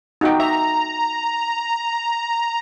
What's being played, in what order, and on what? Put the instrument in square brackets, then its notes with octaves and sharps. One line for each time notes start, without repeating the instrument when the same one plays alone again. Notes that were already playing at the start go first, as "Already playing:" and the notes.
[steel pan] D#4 F#4 G5
[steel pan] E5 [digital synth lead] A#5